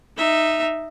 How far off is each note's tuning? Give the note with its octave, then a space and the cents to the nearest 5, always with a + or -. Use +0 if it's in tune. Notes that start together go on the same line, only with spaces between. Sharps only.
D#4 -5 E5 +0